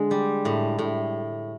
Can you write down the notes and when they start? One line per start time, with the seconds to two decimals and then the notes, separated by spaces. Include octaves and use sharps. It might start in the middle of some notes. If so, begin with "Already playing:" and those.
Already playing: D3 G#3
0.11 G3
0.45 A2
0.79 A2